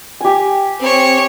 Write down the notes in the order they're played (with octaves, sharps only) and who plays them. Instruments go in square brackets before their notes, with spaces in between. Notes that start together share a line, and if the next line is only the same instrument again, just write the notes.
[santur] G4 G#5
[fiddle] C4 C#5